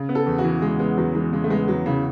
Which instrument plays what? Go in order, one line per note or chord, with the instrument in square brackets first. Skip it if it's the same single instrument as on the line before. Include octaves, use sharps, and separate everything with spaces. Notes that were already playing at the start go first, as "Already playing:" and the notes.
Already playing: [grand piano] C#3
B3
[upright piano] A4
[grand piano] E2
[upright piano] F#4
[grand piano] E3
[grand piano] C#3 [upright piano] G#3
[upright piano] G#3 [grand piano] B3
[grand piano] E2 [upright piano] F#3
[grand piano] E3 [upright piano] G#3
[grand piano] C#3 [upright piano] G#3
[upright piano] A3
[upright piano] G#3 [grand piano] B3
[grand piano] E2 [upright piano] F#3
[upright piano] C#3 [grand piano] E3